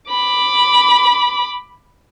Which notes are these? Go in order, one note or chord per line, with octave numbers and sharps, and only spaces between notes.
B5 D6